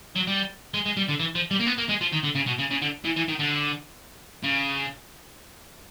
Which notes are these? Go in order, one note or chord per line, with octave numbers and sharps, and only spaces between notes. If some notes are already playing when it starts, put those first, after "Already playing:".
F#3
G3
G#3
G#3
G3
D3
E3
F3
G3
A#3
B3
A#3
G#3
F3
D#3
D3
C#3
B2
C#3
C#3
D3
E3
E3
D#3
D3
C#3